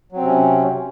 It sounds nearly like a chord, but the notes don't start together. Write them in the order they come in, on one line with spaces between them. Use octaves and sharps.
F#3 C4 C3 C#4